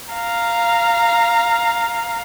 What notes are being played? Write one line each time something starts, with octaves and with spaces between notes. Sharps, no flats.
F5 A#5